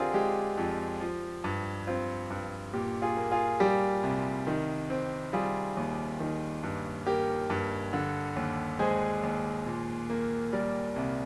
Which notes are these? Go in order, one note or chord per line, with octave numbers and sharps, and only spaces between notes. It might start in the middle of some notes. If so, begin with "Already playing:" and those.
Already playing: D3 C4 F4 G4 G#4 A#4 D5
G#3 G4
F2
F3
G2
C4 F4
G2
A#2 G4
F4 G#4
A#3
F4 G#4
G3 G4
C2
D#3
C4
G3 F4 G#4
D#2
D#3
G2
A#3 G4 A#4
G2
D3
D#2
G#3 G#4 C5
D#2
A#2
A#3
G3 A#4 D5
C2